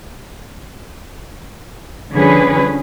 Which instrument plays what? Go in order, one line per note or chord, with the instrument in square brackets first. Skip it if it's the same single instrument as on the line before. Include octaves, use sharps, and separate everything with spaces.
[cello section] D3 F3 G3 C#4 G#4 B4